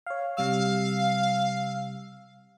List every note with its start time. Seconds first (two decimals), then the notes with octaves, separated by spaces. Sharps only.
0.06 C#5 F5
0.37 C3 G3 F5 E6